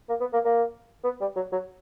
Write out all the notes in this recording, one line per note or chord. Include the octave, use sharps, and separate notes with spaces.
A#3
B3
A#3
A#3
B3
G3
F#3
F#3